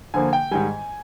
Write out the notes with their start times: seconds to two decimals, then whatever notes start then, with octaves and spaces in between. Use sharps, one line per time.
0.14 D3 F3 A#3 G#5
0.33 G5
0.51 G#2 D#3 G3 G#5